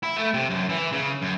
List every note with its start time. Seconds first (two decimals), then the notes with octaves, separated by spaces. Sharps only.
0.03 E4
0.17 A3
0.34 C3
0.50 F#2
0.69 E3
0.92 C#3
1.22 F#2